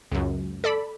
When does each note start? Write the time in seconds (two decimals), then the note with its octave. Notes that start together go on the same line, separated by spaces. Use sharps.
0.11 C#2 F#2
0.64 A4 D5 B5